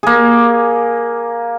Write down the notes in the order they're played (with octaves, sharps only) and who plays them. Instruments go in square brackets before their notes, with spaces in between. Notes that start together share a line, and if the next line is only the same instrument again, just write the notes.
[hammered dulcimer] A#3 G#4